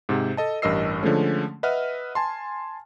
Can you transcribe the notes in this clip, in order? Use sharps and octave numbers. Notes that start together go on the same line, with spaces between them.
G#2 C3
A4 D#5 A5
A1 G2 A#4 D#5 E6 C7
D3 F3 G#3 A3 C#4
B4 D#5 E5 F#5 F6
G#5 A5 C6